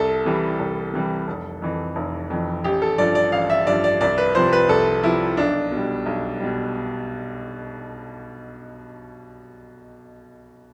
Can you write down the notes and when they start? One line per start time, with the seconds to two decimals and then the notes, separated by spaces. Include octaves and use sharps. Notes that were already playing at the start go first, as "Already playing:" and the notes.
Already playing: C2 A4
0.25 C3 E3 G3
0.59 C2
0.93 C3 E3 G3
1.28 F1
1.62 F2 E3
1.96 F1
2.30 F2 E3
2.64 A1 G4
2.82 A4
2.98 G2 F3 D5
3.15 D5
3.32 A1 F5
3.50 E5
3.67 G2 F3 D5
3.84 D5
4.01 C2 D5
4.18 B4
4.35 C3 F3 C5
4.53 B4
4.69 C2 A4
5.03 C3 F3 E4
5.37 B1 D4
5.71 B2
5.76 G3
6.06 B1
6.40 B2 G3